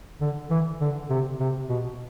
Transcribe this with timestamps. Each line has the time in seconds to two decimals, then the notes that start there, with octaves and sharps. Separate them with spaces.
0.21 D3
0.50 E3
0.80 D3
1.09 C3
1.40 C3
1.69 B2